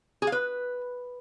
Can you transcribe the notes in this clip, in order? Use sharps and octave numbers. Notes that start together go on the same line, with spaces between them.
G#4
F5
B4